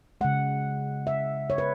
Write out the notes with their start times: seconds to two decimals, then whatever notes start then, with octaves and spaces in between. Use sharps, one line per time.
0.21 C#3 G#3 F#5
1.07 E5
1.50 C#5
1.58 B4